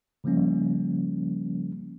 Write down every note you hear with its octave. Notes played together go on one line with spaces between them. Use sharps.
C#3 F3 G3 A#3 C#4